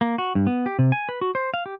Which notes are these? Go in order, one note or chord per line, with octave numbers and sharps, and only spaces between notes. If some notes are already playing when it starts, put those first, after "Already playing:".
A#3
F#4
G2
B3
G4
C3
G#5
B4
F#4
C5
F5
G4